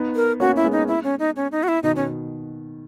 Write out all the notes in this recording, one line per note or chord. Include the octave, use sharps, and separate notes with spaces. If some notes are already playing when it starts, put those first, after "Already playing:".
Already playing: B3 D#4
A#4
A#3 C#4 F#4
E4
G#3 B3
D#4
E4
C#4
D#4
C#4
D#4
F#4
E4
B2 D#3 D#4
B2 C#4